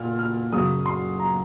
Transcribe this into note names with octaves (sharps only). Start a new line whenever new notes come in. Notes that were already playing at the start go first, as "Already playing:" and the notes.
Already playing: A#2 F6
F6
F#2 C#3 F#3 D#6
C6
A#5